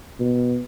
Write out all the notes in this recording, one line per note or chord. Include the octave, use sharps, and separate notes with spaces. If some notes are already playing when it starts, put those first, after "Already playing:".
B2